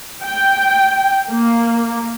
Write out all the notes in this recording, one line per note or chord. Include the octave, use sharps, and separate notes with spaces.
G5
A#3